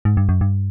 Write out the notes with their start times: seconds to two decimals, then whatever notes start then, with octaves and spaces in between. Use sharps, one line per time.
0.05 G#2
0.17 G2
0.29 F#2
0.41 G2